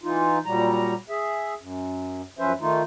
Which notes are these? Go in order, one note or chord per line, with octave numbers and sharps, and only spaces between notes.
E3 D#4 F4
A#2 F#3 G3 A#5
G#4 E5
F#2
F#2 F3 C#4 B4 C5 E5
D#3 A3 D#4 F4